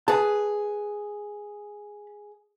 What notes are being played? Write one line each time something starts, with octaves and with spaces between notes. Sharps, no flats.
G#4 B4 A5